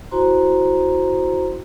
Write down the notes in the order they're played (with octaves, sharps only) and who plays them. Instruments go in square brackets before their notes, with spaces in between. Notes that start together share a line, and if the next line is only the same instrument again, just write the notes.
[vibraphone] E4 F#4 C5 A#5 C6